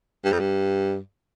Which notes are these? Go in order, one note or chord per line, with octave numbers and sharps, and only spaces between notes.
G2
F2
G2